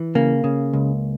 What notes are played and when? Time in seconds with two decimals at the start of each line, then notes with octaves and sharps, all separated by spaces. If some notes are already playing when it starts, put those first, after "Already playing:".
Already playing: E3
0.15 C#3 A#3
0.44 C#3
0.73 C#2